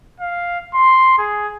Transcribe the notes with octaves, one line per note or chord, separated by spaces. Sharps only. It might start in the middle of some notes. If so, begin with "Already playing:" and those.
F5
C6
G#4